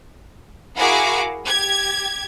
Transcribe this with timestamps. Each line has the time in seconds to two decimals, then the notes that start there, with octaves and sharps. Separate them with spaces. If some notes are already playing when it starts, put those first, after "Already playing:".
0.76 E4 F#4 G#4 A#4 F5 D6
1.45 G4 G#6